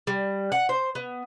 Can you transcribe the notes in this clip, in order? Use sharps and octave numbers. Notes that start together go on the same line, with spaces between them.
G3
F#5
C5
B3